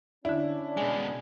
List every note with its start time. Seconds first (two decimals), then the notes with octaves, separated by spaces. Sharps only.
0.25 D3 C#4 D4 E4 D5
0.77 B2 G#3 G#5